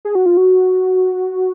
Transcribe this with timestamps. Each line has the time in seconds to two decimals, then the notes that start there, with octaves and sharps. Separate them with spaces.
0.05 G#4
0.15 F#4
0.26 F4
0.37 F#4